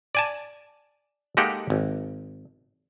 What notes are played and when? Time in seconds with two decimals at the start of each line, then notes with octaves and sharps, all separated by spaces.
0.15 D5 G#5 A5
1.37 G#3 A#3 D#4 G4 A4 F#5
1.70 G#1